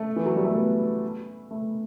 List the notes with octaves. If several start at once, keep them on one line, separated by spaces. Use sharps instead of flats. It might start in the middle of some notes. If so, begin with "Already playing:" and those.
Already playing: A3
E3
F#3
G3
A3
B3
A3